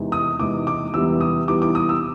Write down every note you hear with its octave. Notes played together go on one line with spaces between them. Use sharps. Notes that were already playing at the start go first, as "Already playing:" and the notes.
Already playing: E2 C3 D#3 G#3
D#6
E2 C3 D#3 G#3 D6
D6
E2 C3 E3 G3 B3 E6
D#6
E2 C3 E3 G3 B3 D6
D6
D#6
E6